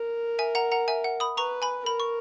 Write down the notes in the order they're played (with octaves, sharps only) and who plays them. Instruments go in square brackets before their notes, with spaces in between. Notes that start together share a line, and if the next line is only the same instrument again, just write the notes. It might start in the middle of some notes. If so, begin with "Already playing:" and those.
Already playing: [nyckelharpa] A#4
[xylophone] E5 G#5
F#5 A#5
F#5 A#5
E5 G#5
F#5
B5 D#6
[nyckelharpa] B4 [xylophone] A#5 C#6
[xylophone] G#5 B5
[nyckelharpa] A#4 [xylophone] B5
[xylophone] C#6